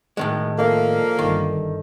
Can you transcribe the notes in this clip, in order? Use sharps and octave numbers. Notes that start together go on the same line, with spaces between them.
A2 D#3 G#3
F3 A#3 A4 D5 E5
G1 D#3